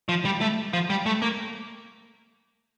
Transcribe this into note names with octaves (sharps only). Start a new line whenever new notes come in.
F3
G3
A3
F3
G3
A3
A#3